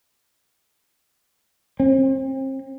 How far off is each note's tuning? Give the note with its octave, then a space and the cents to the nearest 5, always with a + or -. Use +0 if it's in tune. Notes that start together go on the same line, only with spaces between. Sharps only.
C4 +35